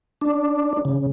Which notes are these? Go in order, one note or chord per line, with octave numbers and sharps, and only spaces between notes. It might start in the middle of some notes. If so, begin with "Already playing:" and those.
D4
C#3